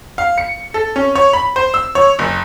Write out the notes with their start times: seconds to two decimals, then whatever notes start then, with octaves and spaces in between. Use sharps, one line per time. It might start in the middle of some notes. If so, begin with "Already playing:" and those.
0.18 F5
0.38 C#7
0.74 A4
0.96 C#4
1.15 C#5
1.33 B5
1.56 C5
1.74 E6
1.95 C#5
2.19 F#1